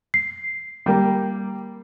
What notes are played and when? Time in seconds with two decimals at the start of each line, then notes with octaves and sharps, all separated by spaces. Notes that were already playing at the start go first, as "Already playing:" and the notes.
0.14 C7
0.86 G3 A#3